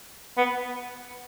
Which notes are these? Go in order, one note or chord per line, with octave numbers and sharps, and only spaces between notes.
B3